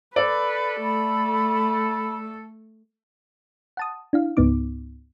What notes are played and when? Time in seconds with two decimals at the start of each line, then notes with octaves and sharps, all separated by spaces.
0.16 A4 B4 D5
0.83 A3 B5
3.77 F#5 A5 D#6
4.13 D4 E4 F5
4.37 C#2 G#2 B3 D#4 D6